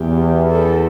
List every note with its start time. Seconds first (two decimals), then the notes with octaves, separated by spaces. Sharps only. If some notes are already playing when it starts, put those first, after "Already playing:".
Already playing: E2 G4
0.49 A4